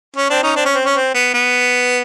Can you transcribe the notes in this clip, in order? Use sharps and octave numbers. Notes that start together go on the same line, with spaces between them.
C#4
C4 D4
C#4 D#4
C4 D4
C#4
C4
C#4
C4
B3
B3